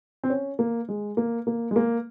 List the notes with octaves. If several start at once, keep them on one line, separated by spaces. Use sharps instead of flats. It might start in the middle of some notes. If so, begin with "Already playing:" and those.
C4
C#4
A#3
G#3
A#3
A#3
G#3
A#3